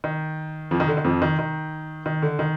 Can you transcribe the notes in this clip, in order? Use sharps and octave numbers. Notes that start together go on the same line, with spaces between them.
D#3
F2 F3
D#3
D3
D#3
F2 F3
D#3
D#3
D#3
D3
D#3